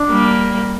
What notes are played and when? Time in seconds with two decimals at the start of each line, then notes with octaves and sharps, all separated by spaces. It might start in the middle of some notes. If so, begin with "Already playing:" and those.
Already playing: D4
0.10 G3 A#3